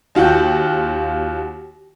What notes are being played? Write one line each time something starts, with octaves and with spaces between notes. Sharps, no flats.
D#2 F4 F#4 G5